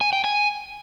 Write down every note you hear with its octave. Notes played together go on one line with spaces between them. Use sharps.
G#5
G5
G#5